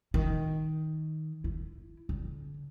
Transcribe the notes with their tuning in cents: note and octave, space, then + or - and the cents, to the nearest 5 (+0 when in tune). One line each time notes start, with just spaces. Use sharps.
D#3 +10
E4 +25
D3 -35